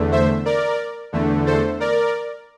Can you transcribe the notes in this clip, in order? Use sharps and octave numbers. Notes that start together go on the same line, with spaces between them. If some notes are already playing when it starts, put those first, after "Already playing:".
Already playing: E2 D3 A3
C5 E5
A#4 D5
E2 D3 A3
A4 C5
A#4 D5